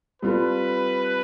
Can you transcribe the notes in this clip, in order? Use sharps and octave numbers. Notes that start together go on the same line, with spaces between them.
G3 C4 F4 A4 B4